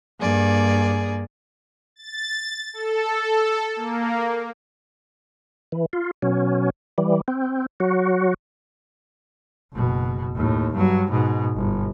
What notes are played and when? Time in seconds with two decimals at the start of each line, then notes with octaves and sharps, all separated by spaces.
0.19 G2 A#3 G#4 D5
1.96 A6
2.73 A4
3.76 A#3
5.72 E3
5.93 F4
6.22 B2 F#3 C#4
6.98 E3 G3
7.28 C4
7.80 F#3 F#4
9.73 F#1 B2
10.35 D#2 A2
10.73 G2 F#3
11.10 G#2 B2
11.56 G1